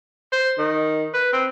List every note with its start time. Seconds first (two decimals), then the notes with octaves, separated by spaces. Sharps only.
0.32 C5
0.58 D#3
1.14 B4
1.33 C4